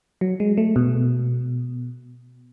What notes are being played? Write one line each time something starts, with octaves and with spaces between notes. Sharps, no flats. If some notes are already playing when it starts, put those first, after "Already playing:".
F#3
G#3
A3
B2